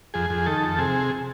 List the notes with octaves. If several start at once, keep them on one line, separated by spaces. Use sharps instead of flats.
F2 G#4
F2
D#3 A4
F2
C3 G#4